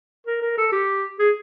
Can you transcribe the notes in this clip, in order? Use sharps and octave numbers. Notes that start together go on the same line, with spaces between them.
A#4
A#4
A4
G4
G#4